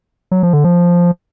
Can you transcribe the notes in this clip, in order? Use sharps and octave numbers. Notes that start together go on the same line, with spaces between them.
F#3
F3
D3
F3